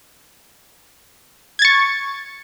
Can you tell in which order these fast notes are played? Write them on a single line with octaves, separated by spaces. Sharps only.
G#6 A6 C#6